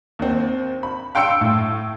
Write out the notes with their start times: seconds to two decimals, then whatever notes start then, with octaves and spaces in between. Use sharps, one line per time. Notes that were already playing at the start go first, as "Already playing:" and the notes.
0.19 D#2 C4
0.83 B5
1.15 F5 G5 C6 E6 C#7 D7
1.41 A2